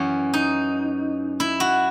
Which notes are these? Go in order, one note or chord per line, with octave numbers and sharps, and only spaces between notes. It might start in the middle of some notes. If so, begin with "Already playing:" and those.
Already playing: F#2 E3 C#4
D#4
E4
F#4